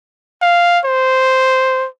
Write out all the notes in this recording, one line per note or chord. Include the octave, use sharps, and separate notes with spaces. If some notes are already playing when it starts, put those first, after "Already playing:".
F5
C5